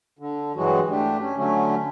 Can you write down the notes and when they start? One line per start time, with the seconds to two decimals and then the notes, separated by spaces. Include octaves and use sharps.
0.19 D3
0.56 G2 E3 F#3 G#3 F#4
0.90 A3 D4 G4
1.21 C#4
1.36 D3 F#3 A3 C#4